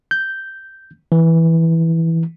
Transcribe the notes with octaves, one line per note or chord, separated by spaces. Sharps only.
G6
E3